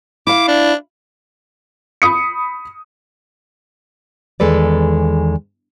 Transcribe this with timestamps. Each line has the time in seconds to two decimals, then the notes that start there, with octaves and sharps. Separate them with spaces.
0.27 E4 F5 D6
0.48 D4
2.02 B5 D#6 C#7
4.40 E2 D#3 G#3 A4 B4 D5